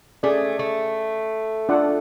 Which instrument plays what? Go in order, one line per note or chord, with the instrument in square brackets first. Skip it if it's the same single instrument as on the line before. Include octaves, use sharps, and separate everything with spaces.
[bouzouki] A3 [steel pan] C#4 G#4 D5
[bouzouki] A3
[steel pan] D4 F4 A4 D5 F#5